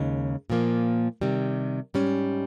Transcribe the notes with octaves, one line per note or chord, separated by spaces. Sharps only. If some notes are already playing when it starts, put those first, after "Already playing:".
Already playing: D#2 C#3 G#3 D#4
A#2 F3 A#3
C3 D#3 G3
G#2 G3 C#4